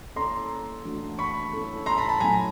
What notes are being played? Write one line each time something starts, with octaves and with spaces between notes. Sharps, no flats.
A#3 C#4 E4 A4 D5 A#5 C6
E3 A3 D4 F#4
B5 C#6
C#4 E4 A4
A#5 C6
A5 B5
A5 B5
A#2 F#3 A3 C#4 E4 G#5 A#5